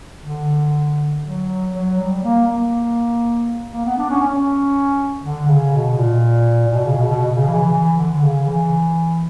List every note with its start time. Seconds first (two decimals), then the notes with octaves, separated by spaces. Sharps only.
0.23 D3
1.23 F#3
1.74 F#3
1.98 G3
2.23 A#3
2.48 A#3
3.73 A#3
3.85 B3
3.98 D4
4.10 C#4
4.23 C#4
5.22 D3
5.48 C#3
5.73 B2
5.97 A#2
6.67 A#2
6.73 B2
6.85 C#3
6.97 B2
7.09 B2
7.22 B2
7.35 C#3
7.47 E3
7.60 E3
7.73 E3
7.97 D3
8.22 C#3
8.47 E3